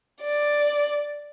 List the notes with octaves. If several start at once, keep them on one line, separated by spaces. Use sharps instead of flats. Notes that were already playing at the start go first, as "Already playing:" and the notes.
D5